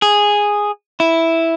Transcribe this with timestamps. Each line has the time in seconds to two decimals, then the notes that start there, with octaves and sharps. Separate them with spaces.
0.02 G#4
1.00 E4